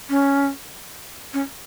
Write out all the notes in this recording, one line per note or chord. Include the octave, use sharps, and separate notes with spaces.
C#4
C#4